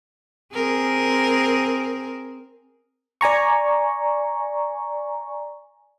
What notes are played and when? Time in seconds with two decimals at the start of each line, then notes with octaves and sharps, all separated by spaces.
0.54 C4 G#4 A#4
3.21 D5 G#5 A#5 C#6